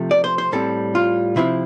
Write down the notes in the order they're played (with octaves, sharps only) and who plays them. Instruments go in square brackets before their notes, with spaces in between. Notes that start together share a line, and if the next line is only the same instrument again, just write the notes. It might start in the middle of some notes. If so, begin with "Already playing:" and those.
Already playing: [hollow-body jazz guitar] C3 F3 A3 C4
D5
C5
C5
A2 G3 C4 A4
F4
C3 F3 C4 E4